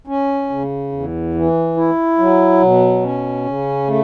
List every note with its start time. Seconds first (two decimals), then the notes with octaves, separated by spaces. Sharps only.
0.07 C#4
0.50 C#3
0.92 E2
1.35 E3
1.77 E4
2.19 F#3
2.61 B2
3.03 C#4
3.46 C#3
3.88 A3